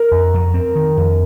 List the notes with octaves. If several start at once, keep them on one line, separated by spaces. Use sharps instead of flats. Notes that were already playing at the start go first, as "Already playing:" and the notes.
Already playing: A#4
F2
F2
C4
D#3
F2